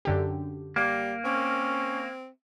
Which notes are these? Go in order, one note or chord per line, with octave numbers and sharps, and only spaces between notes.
F#2 D3 G4
G3 A#3
C4 C#4